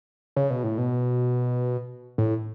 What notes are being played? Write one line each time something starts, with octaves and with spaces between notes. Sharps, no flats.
C#3
B2
A2
B2
A2